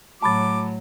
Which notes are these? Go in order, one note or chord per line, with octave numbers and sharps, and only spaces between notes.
A2 F#3 A5 B5 D6 A6